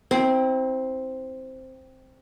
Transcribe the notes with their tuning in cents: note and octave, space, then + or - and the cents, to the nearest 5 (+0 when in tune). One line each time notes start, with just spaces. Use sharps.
C4 +0 E4 -40